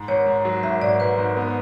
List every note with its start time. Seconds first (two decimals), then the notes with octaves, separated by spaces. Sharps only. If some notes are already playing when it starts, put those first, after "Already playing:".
Already playing: G#2
0.08 G#1 C#5
0.26 G#2
0.45 F#3
0.63 G#1 E5
0.82 G#1 D5
1.00 G#2 B4
1.18 G#1
1.37 B3